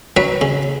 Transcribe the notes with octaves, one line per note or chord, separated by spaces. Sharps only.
F#3 B4
C#3